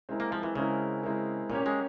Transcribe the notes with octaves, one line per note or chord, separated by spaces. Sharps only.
G#3 C4 E4 A#4
A#3
F3
E3
C#3 G#3 C4 E4 A#4
G#3 C4 E4 A#4
A#2 A#3 C#4 G4 C#5
G#3